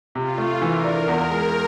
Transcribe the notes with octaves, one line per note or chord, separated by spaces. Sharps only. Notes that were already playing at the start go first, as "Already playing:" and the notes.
C3 F4
A3
E3 A#4
D4
E2 A#4
G#3